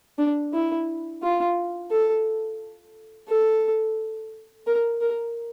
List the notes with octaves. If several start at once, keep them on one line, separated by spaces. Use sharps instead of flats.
D4
E4
F4
A4
A4
A#4
A#4